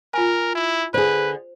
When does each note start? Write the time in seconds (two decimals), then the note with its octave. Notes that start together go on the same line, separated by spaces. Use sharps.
0.14 F4 A#4 G#5
0.55 E4
0.94 D3 G#4 B4 C5